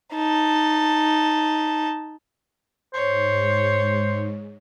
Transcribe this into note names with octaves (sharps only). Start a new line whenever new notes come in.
D#4 A5
G#2 C5 C#5